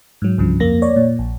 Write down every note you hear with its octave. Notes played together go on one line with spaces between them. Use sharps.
G#2 F#3
C2 G2 C#3 F3
F2 A#3 A#6
C#5 D5
A#2
A#1